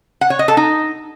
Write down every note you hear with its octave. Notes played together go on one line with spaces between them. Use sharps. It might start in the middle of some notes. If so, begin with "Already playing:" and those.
F#5
C#5
D#5
A4
D#4